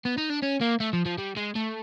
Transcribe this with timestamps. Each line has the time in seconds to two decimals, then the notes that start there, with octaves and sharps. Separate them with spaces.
0.05 B3
0.18 D#4
0.30 D4
0.43 C#4
0.61 A#3
0.80 A3
0.93 F3
1.05 F3
1.18 G3
1.36 G#3
1.55 A3